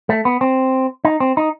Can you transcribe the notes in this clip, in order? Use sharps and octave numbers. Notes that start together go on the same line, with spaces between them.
A3
B3
C4
D#4
C4
D#4